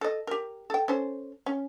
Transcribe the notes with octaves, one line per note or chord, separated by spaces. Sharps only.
A4 D#5
G4 A#4
A4 G5
C#4 A4 C5
C#4